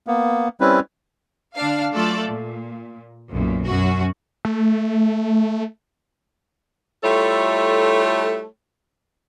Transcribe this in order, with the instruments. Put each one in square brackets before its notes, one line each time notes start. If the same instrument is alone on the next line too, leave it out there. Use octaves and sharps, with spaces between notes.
[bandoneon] A#3 B3
G3 C4 C#4 E4 B4
[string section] D3 D4 F5
F#3 A3 F4 A4 D5
A#2
B1 F#2 A#2
F#2 C#4 F#4
[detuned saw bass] A3
[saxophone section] G3 A3 E4 F4 A4 C#5